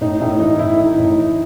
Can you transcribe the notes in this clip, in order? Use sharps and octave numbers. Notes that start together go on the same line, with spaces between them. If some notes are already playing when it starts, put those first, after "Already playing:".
A2 D#4
A2 D#4
E3 D#4
A2 E4
E3 D#4
A2
D#4
E3